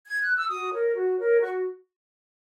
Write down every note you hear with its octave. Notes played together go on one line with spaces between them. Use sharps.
G#6
F#6
E6
F#4 D#6
A#4 C#5
F#4
A#4 C#5
F#4 C#6